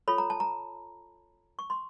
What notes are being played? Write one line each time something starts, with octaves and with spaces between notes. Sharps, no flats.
F4 A4 C#5 B5
A#5
A5
A#5
C#6
C6